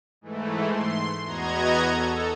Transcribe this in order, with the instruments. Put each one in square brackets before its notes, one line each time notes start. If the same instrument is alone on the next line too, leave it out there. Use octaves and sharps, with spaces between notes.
[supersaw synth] G#2 E3 A3
C6
E2 B3 F#4 D#5 A#5 G#6
A4